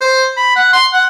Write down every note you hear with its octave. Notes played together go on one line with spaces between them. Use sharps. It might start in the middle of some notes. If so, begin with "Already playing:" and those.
C5
B5
F#5
C6
F#5